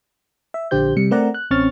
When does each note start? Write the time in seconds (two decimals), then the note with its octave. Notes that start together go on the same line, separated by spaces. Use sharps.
0.54 E5
0.71 A#1 D3 G4 C5 G6
0.96 C3 G3 C#7
1.11 A3 C4 A#4 D5 F#5 A#5
1.34 F#6
1.51 A1 C4 C#4 C#6 F6 A6